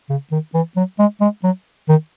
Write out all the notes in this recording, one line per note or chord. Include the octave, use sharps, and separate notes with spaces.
C#3
D#3
E3
F#3
G#3
G#3
F#3
D#3